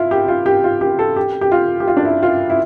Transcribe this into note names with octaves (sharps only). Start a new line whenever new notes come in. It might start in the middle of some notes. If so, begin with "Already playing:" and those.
Already playing: E4 F4
G4
F4
G4
F4
G4
A4
G4
G4
F4
G4
F4
D4
E4
F4
E4